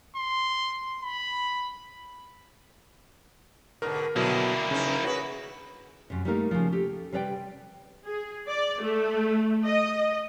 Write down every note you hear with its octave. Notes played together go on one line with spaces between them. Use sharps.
C6
B5
G#2 B2 D3 A#4
B2 D3 F#3 A#3 E4
E2 C#3 D#4
F#4 G#4 B4 C#5
F#2 C3
G3 A3 A#3 D#4 A#4 F5
C#3 F3
G4 A4
C3 G3 B4 D5 G5
G#4
D5
A3
D#5